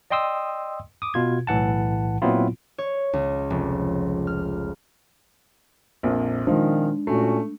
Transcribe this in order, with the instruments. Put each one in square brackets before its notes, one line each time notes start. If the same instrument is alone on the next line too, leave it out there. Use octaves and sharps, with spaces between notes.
[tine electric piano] D5 D#5 G5 C6 D#6 E6
D6 D#6
B2 F4 G#6
B1 A2 E3 F#5 A5
A#2 F#3 B3 C4 E4 F4
[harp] C#5
C#2
F1
F6
[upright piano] A#1 F2 A#2
[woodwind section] A#2 D#3 [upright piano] F3 C4 D#4 [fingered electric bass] G#3 D4
[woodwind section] A#2 C#4 F#4 [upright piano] A3